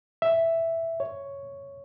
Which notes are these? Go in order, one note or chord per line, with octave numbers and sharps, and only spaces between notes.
E5
C#5